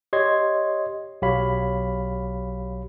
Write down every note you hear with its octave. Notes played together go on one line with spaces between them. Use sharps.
G4 C#5 D#5 C6 G#6
B1 F#3 G4 C#5 F5 B5